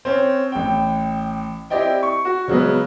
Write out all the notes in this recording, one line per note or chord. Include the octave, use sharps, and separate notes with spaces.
C4 C#4
A1 G5
C4 E4 G4 D5 D#5 G5
C#6
F#4
C#3 F#3 G#3 B3